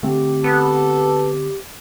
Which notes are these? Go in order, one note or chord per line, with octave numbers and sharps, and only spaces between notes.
D3 A3 C4 G4
B3 A4